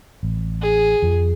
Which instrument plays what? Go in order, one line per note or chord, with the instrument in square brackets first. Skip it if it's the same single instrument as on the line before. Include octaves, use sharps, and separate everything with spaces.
[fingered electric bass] A1
[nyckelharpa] G#4
[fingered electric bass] F2 F3